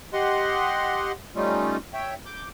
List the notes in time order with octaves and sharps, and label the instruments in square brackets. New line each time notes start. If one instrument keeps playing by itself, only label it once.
[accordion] G4 D#5 F#5 C6
G3 A3 C#4 D#4 F4
C#5 E5 G5
D6 G6